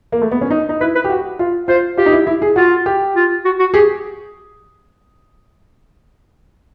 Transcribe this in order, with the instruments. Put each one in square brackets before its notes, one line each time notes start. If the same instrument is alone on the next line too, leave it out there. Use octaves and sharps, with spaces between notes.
[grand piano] A#3
A3
B3
C#4
D#4
D#4
[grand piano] E4 [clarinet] B4
[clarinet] B4
[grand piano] G4
F#4
F4
[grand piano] F4 [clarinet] C5
[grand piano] F4 [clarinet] G4
[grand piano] D#4
E4
E4
G#4
[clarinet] F4 [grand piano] F#4
[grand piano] G4
[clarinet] F4
F#4
F#4
[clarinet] G4 [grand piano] G#4